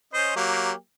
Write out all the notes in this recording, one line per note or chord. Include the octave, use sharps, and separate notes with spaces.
C#4 C5 D#5
F#3 A#3 G4